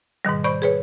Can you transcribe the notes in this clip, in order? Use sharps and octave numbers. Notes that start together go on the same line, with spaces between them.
G#2 B2 D#3 G3
C5 D5 B5 C#6 G6
G#4 B4 C#5